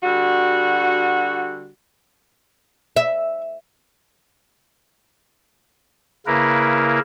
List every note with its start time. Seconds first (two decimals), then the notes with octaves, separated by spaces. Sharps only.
0.04 D3 G3 F#4
2.96 E5
6.26 C#3 A#3 E4 A#4 B4